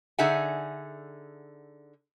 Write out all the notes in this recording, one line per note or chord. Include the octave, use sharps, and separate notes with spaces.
D3 D#4 G#4 E5 F#5 G#5